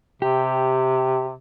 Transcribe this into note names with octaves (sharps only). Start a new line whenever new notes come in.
C3 G4